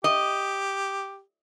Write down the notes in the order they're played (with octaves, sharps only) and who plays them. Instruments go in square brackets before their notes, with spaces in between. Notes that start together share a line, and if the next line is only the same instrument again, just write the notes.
[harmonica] G4 [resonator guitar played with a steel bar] D#5